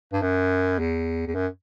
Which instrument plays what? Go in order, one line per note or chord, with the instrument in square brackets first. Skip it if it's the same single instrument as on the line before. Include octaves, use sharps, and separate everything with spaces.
[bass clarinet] G2
F#2
E2
E2
F#2